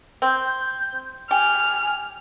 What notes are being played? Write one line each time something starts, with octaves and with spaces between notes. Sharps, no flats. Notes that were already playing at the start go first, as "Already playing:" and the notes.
C4 G6
G4 G#5 F6